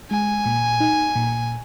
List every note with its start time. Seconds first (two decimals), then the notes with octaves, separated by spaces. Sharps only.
0.11 G#3 G#5
0.45 A#2
0.80 D#4
1.15 A#2